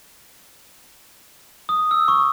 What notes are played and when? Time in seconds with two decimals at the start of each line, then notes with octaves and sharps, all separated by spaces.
1.69 D#6
1.91 E6
2.08 C#6